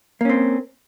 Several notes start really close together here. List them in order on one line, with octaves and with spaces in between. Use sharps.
A#3 C#4 C4